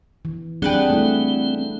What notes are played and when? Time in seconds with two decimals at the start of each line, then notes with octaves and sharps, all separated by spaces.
0.25 E3
0.62 G3 C4 D4 G4 G#4 B4 F#5
0.90 A3 E4